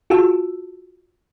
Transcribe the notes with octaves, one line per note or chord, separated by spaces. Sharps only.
F4 F#4 G#4 A5 E6